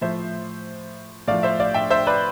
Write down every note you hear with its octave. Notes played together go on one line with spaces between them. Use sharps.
A2 F3 C5 E5
A2 F3 D5 F5
C5 E5
D5 F5
E5 G5
C5 E5
B4 D5